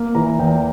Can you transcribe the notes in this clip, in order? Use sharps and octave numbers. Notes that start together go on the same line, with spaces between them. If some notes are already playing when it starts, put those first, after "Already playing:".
Already playing: A#3
E3 A#5
E2 G5